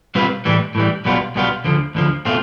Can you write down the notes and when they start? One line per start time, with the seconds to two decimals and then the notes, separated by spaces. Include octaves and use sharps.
0.15 B2 G3 C4 F4 B4
0.45 A2 E3 G3
0.75 A2 E3 G3
1.05 B1 B2 G3 B3 F4
1.35 B1 B2 G3 B3 F4
1.64 D2 D3 F3
1.95 D2 D3 F3
2.25 B2 A3 C4 F4